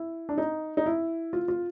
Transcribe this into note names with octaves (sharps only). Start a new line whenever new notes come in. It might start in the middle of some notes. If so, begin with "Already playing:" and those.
Already playing: E4
D4
D#4
D#4
E4
F4
F4